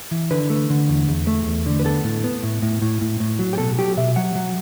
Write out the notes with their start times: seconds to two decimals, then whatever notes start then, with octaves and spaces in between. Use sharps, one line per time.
0.11 E3
0.31 D3 B4
0.50 A3
0.70 D3
0.89 E2
1.08 E2
1.27 A3
1.46 E2
1.66 D3
1.79 B4
1.85 B3 A4
2.04 A2
2.24 B3
2.43 A2
2.62 A2
2.82 A2
3.01 A2
3.20 A2
3.39 F#3
3.53 G4
3.58 B2 A4
3.78 F#3 G4
3.97 B2 E5
4.16 F#3 F#5
4.35 F#3